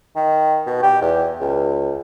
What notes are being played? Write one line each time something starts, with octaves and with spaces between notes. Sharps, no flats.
D#3
B2
G4
E2
C#2